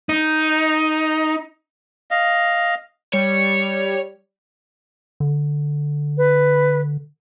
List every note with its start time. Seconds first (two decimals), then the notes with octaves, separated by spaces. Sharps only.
0.09 D#4
2.11 D#5 F5
3.13 G3 C#5
5.20 D3
6.18 B4